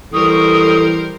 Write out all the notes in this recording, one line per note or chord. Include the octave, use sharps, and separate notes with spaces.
E3 G3 A4 A#4 C5 C#6 D#6